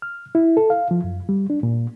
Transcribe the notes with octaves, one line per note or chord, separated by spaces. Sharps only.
F6
E4
A4
F5
F3
F#2
G3
D4
A#2